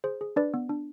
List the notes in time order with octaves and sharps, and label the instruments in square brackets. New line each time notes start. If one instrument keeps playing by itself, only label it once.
[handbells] G#4 C5
G#4
D4 B4 D5
B3
D4